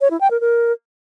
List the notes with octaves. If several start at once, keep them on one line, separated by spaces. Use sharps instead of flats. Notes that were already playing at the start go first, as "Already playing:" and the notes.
C#5
E4
G5
A#4
A#4